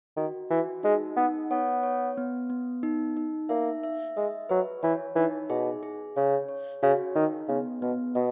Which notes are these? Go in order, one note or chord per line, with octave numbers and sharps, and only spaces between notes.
D#3 F#4
E3 F#4
G#3 D#4
B3 D#4
B3 C#5
C#5
B3
B3
D#4
D#4
A#3 E5
E5
G#3 D#5
F#3 B4
E3 C#5
E3 D#4
B2 G#4
G#4
C#3 C#5
C#5
C#3 F#4
D#3 D#4
C#3 B3
B2 B3
B2 D#5